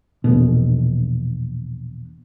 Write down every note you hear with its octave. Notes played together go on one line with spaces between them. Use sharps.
A#1 E2 B2